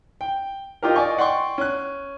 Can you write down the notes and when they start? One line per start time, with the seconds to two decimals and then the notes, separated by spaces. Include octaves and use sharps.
0.21 G5
0.82 D#4 F4 G4 A#4
0.96 D5 D#5 G#5 C#6
1.18 D5 F#5 G5 C6 C#6
1.58 C#4 F#6